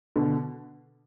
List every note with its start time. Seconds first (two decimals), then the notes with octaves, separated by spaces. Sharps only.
0.16 B2 D3